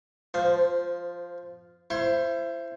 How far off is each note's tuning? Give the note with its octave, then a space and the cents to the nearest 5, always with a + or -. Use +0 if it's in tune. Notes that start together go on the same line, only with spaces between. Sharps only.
F3 +0 C5 -20
E4 +30 C5 +0 C6 +45